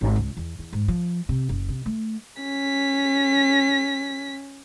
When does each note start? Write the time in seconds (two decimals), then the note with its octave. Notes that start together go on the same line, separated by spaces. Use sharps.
0.01 G#1
0.16 C#2
0.37 E2
0.59 E2
0.73 G#2
0.88 F3
1.29 C3
1.49 F#1
1.68 C3
1.86 A3
2.42 C#4 B6